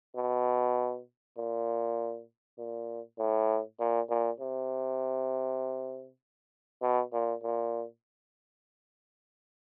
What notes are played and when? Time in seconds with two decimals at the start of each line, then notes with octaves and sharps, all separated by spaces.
0.15 B2
1.37 A#2
2.58 A#2
3.18 A2
3.79 A#2
4.09 A#2
4.39 C3
6.82 B2
7.13 A#2
7.43 A#2